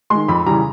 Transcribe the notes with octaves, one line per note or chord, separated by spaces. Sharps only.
D#3 G#3 C6
F2 B5
C#3 E3 G3 A#5